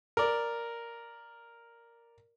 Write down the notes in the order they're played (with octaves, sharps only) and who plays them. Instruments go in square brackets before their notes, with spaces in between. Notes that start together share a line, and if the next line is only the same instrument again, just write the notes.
[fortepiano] A#4 D5